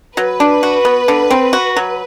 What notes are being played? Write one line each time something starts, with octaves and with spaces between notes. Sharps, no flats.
F#3 B4
D4
F#4
B3
D3
C4
F#4
F#3